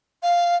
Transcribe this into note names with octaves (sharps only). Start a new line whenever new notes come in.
F5